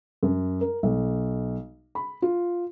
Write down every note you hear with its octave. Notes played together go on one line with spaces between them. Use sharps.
F#2
A#4
B1
B5
F4